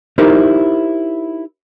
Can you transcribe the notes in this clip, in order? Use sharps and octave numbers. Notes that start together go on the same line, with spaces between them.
D#4 E4 G4 A#4 C5